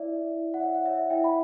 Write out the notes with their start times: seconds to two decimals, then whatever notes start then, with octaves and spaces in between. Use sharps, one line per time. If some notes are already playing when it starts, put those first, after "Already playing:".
Already playing: E4 C#5 D5 E5
0.11 E4
0.36 E4
0.54 F#5
0.60 C#5 E5
0.75 F#5
0.86 C#5 E5
1.10 E4 E5 G5
1.24 B5